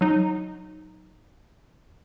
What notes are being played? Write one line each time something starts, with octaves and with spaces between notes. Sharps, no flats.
F#3 D#4